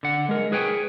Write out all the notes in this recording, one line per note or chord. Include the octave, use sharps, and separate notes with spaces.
D3 F#5
G#3 A#4
G#4 B4 C#5 G5 G#5